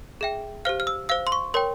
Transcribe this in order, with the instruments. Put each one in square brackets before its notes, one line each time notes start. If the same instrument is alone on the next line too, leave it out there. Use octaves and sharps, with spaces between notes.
[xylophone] G#4 E5 G5
G4 C5 F5 F6
F6
E6
C5 F5 E6
C6
C#6
A#4 C#5 G5 C6